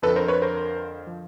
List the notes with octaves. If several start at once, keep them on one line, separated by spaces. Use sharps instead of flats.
F2 D3 F3 A4 B4
A#4 C5
B4 C#5
A#4 C5
F3